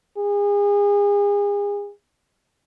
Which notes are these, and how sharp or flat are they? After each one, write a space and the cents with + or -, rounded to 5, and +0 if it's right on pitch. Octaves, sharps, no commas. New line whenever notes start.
G#4 -35